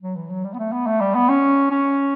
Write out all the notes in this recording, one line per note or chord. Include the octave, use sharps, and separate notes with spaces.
F#3
E3
F#3
G3
B3
A3
B3
A3
G3
B3
C#4
C#4